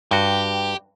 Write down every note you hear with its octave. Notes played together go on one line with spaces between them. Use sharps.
G2 F#4 G4